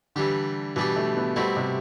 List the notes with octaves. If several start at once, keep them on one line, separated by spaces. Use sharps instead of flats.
D3 E3 G3 D4 G4
B2 E3 G3 D4 G4
A3
B3
B2 G3 A3 C4 E4
C3